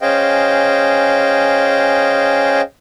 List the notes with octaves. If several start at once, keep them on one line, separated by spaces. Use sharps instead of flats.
C#4 G#4 C5 D#5 F5 G5